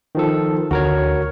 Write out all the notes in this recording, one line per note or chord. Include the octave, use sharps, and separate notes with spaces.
D#3 F3 A4
D2 F#4 A#4 C#5